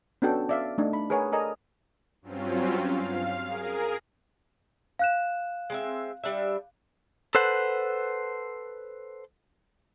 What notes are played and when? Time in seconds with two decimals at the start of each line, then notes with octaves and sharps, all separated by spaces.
0.22 B3 C#4 D4 F#4 A4 G5
0.49 D5 E5 F5
0.78 A3 D4 D#4
0.93 B5
1.10 G#4 A#4 B4 C#5 F#5 G#5
1.32 A4 A#4 D5 D#5 G#5 A#5
2.22 G2 F#3 C4 C#4 F4
2.80 F5
3.46 G#4 A#4
4.99 F5 F#6 E7
5.70 G#3 C4 E5
6.23 G3 D4 E5
7.35 A4 B4 C5 F#5